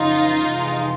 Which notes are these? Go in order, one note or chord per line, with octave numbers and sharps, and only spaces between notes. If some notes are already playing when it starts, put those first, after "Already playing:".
Already playing: F2 C#3 E3 D#4 F4
F2 C3 E3 G#3